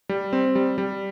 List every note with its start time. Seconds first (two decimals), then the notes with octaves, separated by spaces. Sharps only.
0.09 G3
0.33 C4
0.55 G3
0.78 G3